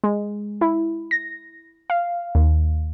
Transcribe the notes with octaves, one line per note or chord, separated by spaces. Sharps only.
G#3
E4
A#6
F5
D#2